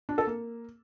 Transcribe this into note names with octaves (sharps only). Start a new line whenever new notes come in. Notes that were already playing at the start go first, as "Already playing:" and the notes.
D4
A4
A#3